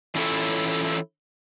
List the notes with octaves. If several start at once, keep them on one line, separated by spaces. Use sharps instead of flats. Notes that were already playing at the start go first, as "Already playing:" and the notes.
E3 C#4 E4 F4 A4 C#5